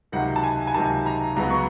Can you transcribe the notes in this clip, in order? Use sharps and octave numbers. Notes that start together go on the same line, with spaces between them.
C#2 C3 D#3 F#3 F#5
A5
G#5
G#5
C#2 C3 D#3 F#3 A5
A#5
C#2 C#3 F#3 B3 A#5
C#6